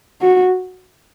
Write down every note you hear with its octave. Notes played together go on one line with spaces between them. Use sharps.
F#4